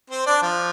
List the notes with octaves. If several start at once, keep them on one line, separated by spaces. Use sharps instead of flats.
C4 C5
D4 D5
F3 F4